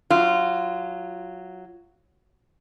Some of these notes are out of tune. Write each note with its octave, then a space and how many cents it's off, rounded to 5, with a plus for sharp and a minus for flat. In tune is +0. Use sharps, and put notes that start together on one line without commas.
F#3 +0 F4 -20